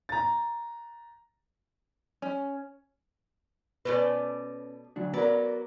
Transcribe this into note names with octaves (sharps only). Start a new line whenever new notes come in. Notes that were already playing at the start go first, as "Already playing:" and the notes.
A#5 A6
C#4
B2 A3 C#4 B4 D5
D2 F#3 D4
F#3 B3 A#4 D5